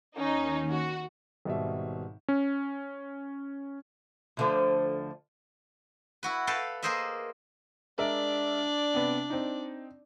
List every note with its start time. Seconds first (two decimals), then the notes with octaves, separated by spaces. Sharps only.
0.16 D#2 D#3 C#4 D#4
0.69 F#4
1.45 G#1 B2 G3 E5
2.28 C#4
4.37 D2 D3 F3
6.23 E4 F#4 B4
6.47 A4 B4 F5 G5 A5
6.83 A#3 G#4 A#4 C5 D#5 E5
7.98 G#3 D4 A#4 D5 E5
8.94 C3 B3
9.30 C4 D#4